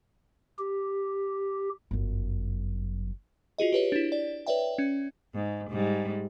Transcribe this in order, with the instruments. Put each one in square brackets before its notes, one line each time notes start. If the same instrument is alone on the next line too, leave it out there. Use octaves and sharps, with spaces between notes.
[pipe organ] G4
[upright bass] G1 F#2
[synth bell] F4 F#4 G#4 D#5
G4 B4 C#5
D4 E4
D5
B4 C#5 D5 E5 G5
C#4
[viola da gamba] G#2
G#2 G3